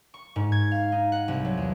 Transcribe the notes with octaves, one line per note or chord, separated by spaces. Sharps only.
C#6
G#2
G#6
F5
D#4
F#5
C2
F#3
E2